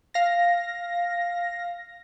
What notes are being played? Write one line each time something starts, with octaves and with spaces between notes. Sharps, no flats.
F5 A#6